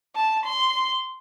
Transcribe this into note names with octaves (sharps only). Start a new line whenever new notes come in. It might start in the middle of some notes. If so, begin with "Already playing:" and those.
A5
C6